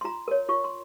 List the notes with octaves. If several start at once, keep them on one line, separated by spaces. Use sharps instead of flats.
C6
F4 A#5
A#4 C#5
F4 C#6
C6